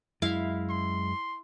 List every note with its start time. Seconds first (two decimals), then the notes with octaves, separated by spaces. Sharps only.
0.22 F#2 G#3 E4 E5 F5
0.70 C6